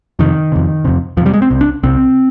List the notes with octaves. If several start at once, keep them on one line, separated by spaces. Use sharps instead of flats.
F2 C3 D#3
F2 C3
F2 C3
F2 C3 F3 G3
G#3
C4
C2 C3
D4
C2 C3 C4